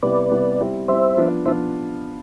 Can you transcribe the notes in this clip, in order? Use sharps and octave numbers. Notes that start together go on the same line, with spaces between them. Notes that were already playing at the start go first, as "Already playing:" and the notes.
C3 G3 B3 E4 B4 D5
C3 G3 B3 E4
G3 C4 E4
G3 C4 E4 C5 E5
F3 B3 D4 F4
F3 B3 D4 F4 C5 E5